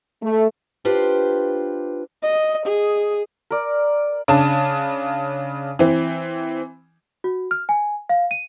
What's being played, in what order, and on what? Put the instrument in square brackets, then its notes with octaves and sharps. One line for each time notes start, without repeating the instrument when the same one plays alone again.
[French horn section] A3
[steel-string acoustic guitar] D4 F4 G4 B4 C5
[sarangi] D#5
G#4
[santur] A#4 D5
[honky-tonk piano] C#3 D4 A5
E3 C4
[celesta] F#4
F6
G#5
F5
D#7